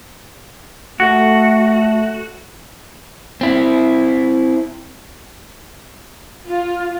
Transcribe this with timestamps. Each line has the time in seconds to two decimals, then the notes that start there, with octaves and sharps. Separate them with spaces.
1.00 A3 F#4
3.41 C4 E4
6.47 F4